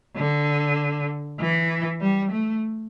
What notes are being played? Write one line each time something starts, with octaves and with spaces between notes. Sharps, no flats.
D3
E3
G3
A3